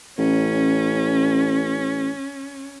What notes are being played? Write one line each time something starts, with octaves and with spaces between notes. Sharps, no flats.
A1 C#4